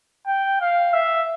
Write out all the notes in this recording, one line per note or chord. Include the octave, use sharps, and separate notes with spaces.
G5
F5
E5